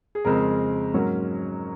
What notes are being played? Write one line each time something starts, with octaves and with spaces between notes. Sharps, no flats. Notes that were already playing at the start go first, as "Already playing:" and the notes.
G#4
F2 C#3 G#3 C4 A#4
G#2 F#3 A#3 C#4